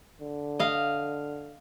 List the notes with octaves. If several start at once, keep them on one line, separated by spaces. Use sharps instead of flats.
D3
D#5 F5